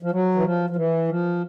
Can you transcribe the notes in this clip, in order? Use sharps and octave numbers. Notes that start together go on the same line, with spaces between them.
F3
F#3
E3
F3
F3
E3
F3